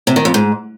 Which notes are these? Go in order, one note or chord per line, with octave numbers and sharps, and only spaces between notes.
C3
D#3
F2
G#2